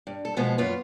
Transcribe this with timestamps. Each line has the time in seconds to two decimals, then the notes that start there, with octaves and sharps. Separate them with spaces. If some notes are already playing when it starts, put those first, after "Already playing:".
0.07 G2
0.25 A4
0.36 B2 F3 G#3 B3
0.58 F#2 B3 F4